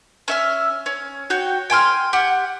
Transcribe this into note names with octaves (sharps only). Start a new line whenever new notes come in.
C#4 E5 F6
C#4
F#4 C#5 G5
G5 G#5 C6 F6
G4 F#5